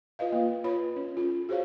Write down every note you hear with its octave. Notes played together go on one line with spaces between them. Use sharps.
F4 B4 D#5 F5
A#3 F4
F4 B4 C#5 B5
C#4
F4 A4
F#4 G#4 C5 C#5 F5